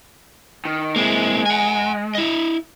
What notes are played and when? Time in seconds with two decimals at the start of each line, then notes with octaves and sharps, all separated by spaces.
0.65 D#3
0.96 G#3 A#3 C4 E4
1.46 F#5 G#5
2.15 E4 D#5